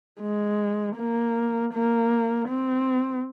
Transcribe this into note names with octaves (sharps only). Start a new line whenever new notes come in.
G#3
A#3
A#3
C4